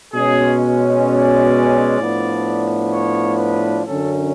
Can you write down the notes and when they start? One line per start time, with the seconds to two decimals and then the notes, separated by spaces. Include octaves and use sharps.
0.13 B2 G#3 C#4 G#4
1.06 D5
1.99 A2 F3 B3 D4
2.92 C#5
3.39 B4
3.84 F#2 D3 F#3 C#4 A4